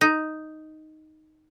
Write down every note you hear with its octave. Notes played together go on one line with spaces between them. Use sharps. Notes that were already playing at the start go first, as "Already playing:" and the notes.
D#4